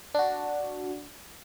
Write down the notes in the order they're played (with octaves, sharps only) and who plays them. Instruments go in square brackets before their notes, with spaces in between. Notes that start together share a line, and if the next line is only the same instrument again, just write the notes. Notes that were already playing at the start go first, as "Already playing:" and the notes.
[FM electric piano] D4 F#4